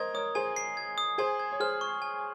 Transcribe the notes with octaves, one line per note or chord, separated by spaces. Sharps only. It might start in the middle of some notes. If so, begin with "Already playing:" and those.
Already playing: A#4 C5 D#5 G#6
A#4 C#5 D#6
G#4 C5 G#5
C7
G#6
D#6
G#4 C5 G#5
G#6
C#5
G#4 C5 F6
C#6
G#5